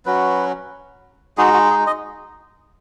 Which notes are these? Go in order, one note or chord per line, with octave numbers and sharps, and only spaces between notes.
F#3 C#4 F#4 B4
G#3 D#4 F#4 G#4
F#4
G#4
D#5